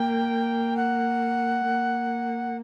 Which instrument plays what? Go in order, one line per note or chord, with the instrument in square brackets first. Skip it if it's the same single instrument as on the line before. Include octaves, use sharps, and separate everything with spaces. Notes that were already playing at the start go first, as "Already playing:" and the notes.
Already playing: [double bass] A#3 [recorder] G5
[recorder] F#5
[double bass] A#3